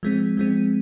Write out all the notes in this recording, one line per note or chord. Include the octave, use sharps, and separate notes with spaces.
F3 G#3 C4
F3 G#3 C4